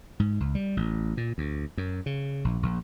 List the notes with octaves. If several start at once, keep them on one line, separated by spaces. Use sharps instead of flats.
G#2
C#2
G3
A1
A#2
D2
F#2
C#3
A#1
A#1